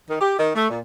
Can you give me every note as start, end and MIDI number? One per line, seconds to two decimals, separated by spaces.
0.08 0.20 51
0.21 0.37 67
0.38 0.50 51
0.55 0.70 57
0.70 0.78 46